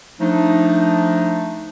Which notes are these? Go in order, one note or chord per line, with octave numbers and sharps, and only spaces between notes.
F3 A3 D4 D#4